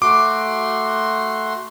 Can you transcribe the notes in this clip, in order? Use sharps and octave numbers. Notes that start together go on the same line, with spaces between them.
A3 F#4 C6 D6